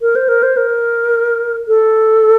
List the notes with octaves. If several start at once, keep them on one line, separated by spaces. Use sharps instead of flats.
A#4
C5
A#4
C5
A#4
A4